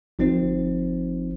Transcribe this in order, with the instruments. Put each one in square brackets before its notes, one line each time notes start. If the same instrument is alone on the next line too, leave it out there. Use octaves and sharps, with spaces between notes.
[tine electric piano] G1 F3 C4 D#4 C5